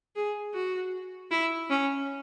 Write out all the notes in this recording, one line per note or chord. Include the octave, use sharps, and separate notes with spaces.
G#4
F#4
E4
C#4